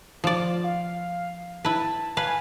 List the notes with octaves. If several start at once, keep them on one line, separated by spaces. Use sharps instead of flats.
F3 D5
F4
F5
E4 B4 A5
B4 F5 G#5